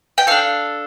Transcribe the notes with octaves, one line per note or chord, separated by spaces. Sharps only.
G5
D4 A4 F5